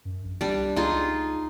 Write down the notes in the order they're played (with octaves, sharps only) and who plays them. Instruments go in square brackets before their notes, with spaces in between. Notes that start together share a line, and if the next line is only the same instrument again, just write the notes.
[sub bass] F#2
A#1
[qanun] G3 D4
[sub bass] C2
[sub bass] C#2 [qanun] D#4 F4 G#4